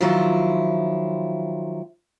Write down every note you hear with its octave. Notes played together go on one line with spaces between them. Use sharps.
D#3 F3 F#3 E4 F4